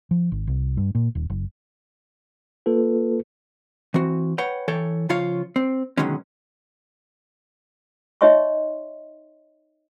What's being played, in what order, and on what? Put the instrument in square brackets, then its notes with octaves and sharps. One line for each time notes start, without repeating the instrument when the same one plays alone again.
[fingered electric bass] F3
G#1
C2
G2
A#2
D#1
F#1
[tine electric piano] A#3 F4 A4 B4
[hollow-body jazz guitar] E3 C4 F#4
B4 C#5 F#5 G5
E3 A4 C#5 G5
C#3 F3 F4 C#5 F5
C4
B2 D3 D#3 F#3 G#3 C#4
[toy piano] D#4 C#5 D#5 E5 C6 C#6